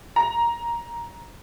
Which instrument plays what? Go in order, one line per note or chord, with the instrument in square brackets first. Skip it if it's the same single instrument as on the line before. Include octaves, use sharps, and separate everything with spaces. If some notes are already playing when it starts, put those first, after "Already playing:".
[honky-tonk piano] A#5